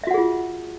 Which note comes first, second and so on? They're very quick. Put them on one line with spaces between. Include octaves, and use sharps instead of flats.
E5 F#4 F#5 G#4 F4